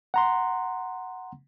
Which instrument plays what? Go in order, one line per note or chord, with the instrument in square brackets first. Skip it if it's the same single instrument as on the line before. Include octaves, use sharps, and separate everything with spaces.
[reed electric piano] F#5 A#5 C6